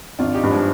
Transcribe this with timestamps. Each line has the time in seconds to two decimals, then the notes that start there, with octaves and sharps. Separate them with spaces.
0.19 G#1 D4 F4
0.35 D#4 G4
0.43 G2
0.51 F3 G#3